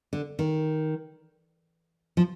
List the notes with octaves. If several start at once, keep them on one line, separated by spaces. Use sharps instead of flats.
D3
D#3
F3